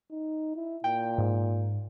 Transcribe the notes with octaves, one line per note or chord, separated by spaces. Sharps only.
D#4
E4
A#2 G5
G#2